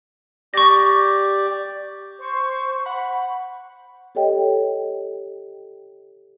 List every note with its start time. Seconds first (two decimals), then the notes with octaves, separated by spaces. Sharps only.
0.54 G4 D5 C#6 A#6
2.20 C5 C#6
2.86 F#5 B5
4.15 G4 A4 C#5 D#5 G5